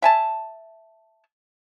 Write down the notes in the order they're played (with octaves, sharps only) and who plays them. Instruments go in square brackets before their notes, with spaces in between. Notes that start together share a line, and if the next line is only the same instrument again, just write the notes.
[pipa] E5 G#5 A5